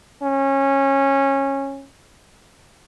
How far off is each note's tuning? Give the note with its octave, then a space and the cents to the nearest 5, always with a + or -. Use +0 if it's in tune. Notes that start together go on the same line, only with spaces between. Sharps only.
C#4 -20